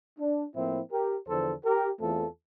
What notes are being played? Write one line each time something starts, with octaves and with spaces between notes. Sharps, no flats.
D4
A2 F3 A#3 C4 E4
G4 A#4
E2 D3 F3 A4 C5
G4 A#4
E2 E3 A3 C4 F4 A4